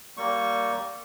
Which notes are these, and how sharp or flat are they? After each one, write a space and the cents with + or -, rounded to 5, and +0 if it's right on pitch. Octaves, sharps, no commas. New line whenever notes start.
G3 -10 A#3 +0 C#6 +0